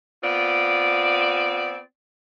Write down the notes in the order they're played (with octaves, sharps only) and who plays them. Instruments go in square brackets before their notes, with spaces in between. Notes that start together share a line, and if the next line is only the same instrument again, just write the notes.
[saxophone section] B3 C4 F4 D5